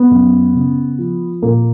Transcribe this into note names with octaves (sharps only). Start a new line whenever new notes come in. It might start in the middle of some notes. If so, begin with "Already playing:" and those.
Already playing: B3
F#2
C#3
F3
A#2 A#3